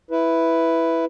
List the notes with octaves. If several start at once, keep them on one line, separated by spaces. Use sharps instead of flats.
E4 B4